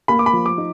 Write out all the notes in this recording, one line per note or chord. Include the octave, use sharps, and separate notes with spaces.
A#3 B5
D6
B5
F3
D6
D#4